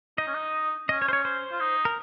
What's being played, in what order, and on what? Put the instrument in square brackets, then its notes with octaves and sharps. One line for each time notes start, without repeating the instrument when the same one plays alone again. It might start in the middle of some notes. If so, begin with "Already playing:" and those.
[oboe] D#4 [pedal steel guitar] D#5
[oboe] C#4
D#4
[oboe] C#4 [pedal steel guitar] D#5
[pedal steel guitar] C#5
C5
C#5
C5
[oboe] F4
D#4
[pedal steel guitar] A#4